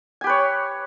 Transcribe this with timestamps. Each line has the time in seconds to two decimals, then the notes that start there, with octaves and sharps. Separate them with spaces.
0.21 G#5
0.24 G4
0.27 B4
0.30 C#5